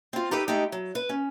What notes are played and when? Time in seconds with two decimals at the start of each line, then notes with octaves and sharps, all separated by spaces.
0.13 C4 F4
0.31 D#4 G4 A4 B4
0.48 G#3 A3 D#4 G4
0.72 F#3
0.95 B4
1.09 C#4